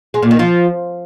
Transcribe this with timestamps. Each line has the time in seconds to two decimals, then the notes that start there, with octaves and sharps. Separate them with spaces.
0.14 G#3
0.22 A#2
0.31 D#3
0.39 F3